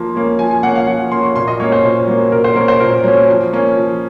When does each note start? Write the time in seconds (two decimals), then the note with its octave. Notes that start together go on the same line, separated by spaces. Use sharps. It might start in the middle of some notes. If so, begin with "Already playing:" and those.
Already playing: F3 A#3 C6
0.15 A#3 C#4
0.39 F3 G#5
0.51 G#5
0.63 A#3 F#5
0.67 C#4
0.75 F5
0.87 F3 F#5
1.11 A#3 C#4 C6
1.23 C#6
1.36 A#2 C6
1.48 D#5
1.59 F#3 A#3 C#4 C#5
1.72 C5
1.84 A#2
2.07 F#3 A#3 C#4
2.32 A#2 A#4
2.44 C5
2.55 F#3 A#3 C#4 A#4
2.68 C5
2.80 A#2 A#4
3.04 F#3 A#3 C#4
3.29 F3
3.53 A#3 C#4
3.77 F3